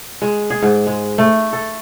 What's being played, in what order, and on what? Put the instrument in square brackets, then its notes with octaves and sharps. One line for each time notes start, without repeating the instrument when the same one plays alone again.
[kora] G#3
G#4
G#2
G#3
A3
A4